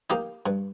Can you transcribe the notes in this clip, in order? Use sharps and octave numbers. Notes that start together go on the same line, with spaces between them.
A#3 D#4 G4
G2